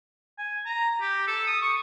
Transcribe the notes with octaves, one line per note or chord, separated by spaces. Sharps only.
G#5
A#5
G4
A4
D#6
C#6